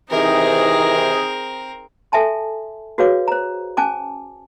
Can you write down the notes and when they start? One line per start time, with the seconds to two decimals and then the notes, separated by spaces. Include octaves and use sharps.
0.10 C3 D#3 E3 C4 D#4 G#4 A#4
2.12 A4 E5 G#5 A5 C6
2.98 F#4 G#4 B4 C#5 F5 D6
3.28 C5 A#5
3.77 C#4 G#5 A5 D6